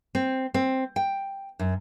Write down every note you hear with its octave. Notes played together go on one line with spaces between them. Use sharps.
C4
C4
G5
F#2